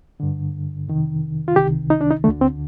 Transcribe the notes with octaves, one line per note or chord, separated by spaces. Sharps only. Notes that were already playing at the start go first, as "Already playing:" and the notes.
G2 D3
F2 C3 D#3
F4
C2 C3 D#3 G4
D#4
D4
D#4
D2 D3 A3
C4